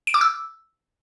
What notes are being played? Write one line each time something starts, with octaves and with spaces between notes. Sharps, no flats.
D7
D6
E6